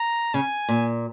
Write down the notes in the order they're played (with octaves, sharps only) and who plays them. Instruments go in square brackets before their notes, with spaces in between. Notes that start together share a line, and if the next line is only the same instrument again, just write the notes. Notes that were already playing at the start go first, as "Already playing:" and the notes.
Already playing: [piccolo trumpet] A#5
[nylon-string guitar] C#3 [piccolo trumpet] G#5
[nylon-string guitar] A#2